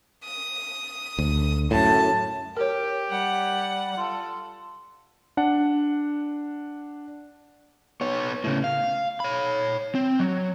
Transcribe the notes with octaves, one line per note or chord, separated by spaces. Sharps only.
D#6
D2
F#2 A2 A5
G4 A#4 C#5
G3 F#5
F4 A4
D4 F#5
B3 C#5
A2 C#3
F5
C#5 B5
C4
F#3